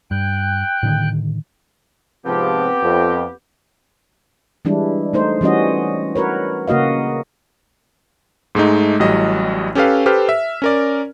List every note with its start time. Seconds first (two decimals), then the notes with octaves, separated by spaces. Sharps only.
0.11 G2 G5 F#6
0.83 A2 D3 D#3
2.25 G#2 C3 F3 B3 C4 G4
2.82 F2
4.65 E3 G3 G#3 D4 E4
5.13 A3 D#4 C5
5.41 E3 G3 C#4 F#4 D#5
6.16 F#4 A#4 B4 C#5
6.67 C#3 A#3 F#4 D#5 F5
8.55 G#2 G#3 A3 D#4
9.00 A1 A2 F#3 G3 D#5
9.75 C#4 G4 A4 B4 F5
10.06 G4 A4 B4 C5 F6
10.29 E5
10.62 C#4 A#4 D5